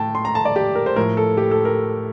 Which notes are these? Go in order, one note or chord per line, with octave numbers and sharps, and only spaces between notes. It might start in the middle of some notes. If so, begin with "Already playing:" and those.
Already playing: A2 G5 A5
C6
A#5
A5
D5
G4
A#4
C5
A2 F3 A#4
A4
G4
A4
A#4